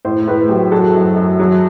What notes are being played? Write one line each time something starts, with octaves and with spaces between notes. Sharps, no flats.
A2 C5
A2 B4
F#3 G4
F#3 A4
F#2
F#2
F#3